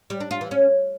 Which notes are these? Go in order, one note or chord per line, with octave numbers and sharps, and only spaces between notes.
G3
D4
F4
E3
C#4